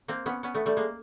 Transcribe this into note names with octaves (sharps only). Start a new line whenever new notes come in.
A#3 C4
B3 C#4
B3 C#4
A3 B3
G3 A3
G#3 A#3